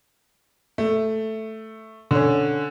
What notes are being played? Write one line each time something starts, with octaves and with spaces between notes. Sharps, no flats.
A3
D3 C#4